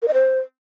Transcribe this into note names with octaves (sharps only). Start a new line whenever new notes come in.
A#4
D#5
C5